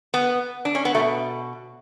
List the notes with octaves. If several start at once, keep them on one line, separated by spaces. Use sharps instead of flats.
B3
D4
C#4
B3
B2 A3